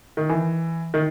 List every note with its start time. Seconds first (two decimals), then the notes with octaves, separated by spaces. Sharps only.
0.17 D#3
0.29 E3
0.94 D#3